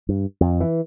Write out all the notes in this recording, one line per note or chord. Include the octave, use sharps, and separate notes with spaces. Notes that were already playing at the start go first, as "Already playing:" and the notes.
G2
F2
E3